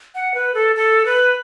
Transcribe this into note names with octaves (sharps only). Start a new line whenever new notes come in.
F#5
B4
A4
A4
B4